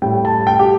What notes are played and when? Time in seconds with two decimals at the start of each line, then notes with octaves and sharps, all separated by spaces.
0.02 A2 G3 G5
0.25 A5
0.47 G5
0.59 G4